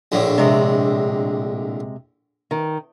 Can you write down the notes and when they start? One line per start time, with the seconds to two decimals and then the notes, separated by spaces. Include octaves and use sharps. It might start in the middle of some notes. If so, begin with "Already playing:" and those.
0.12 A#1 A2 D3
0.38 C3 G#3
2.51 D#3